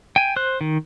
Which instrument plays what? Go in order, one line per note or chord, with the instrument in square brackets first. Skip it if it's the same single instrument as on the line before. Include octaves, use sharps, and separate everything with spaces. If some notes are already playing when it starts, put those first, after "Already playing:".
[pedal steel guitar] G5 G#5
C5 F#6
D#3